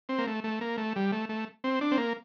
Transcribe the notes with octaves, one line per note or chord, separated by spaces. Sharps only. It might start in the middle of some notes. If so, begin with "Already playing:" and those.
C4
A#3
A3
A3
A#3
A3
G3
A3
A3
C4
D4
C4
A#3